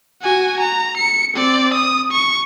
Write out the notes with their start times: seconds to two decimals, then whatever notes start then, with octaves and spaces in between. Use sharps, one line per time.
0.22 F#4 G#5
0.60 A#5
0.98 C#7
1.35 C4 D5
1.74 D#6
2.12 C#6